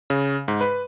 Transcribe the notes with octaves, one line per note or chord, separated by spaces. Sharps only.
C#3
G#2
B4